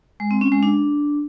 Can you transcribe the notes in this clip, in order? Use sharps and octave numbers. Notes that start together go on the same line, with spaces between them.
G#3
C4
C#4
G#3
D4